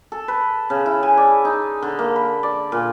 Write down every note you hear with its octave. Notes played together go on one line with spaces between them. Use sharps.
A4
B4
C#3
E4
G#5
D5
D#4
D3
A#3
B5
D5
A#2